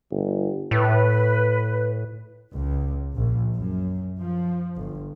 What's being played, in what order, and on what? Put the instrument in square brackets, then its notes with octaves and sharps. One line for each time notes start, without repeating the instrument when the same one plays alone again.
[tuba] G1
[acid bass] A2 [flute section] B4
[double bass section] C#2
A#1
F#2
F3
G1